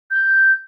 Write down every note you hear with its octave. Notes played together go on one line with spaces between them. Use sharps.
G6